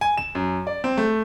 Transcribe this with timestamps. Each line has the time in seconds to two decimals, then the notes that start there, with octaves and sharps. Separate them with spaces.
0.01 G#5
0.17 E7
0.35 F#2
0.67 D5
0.84 C4
0.97 A3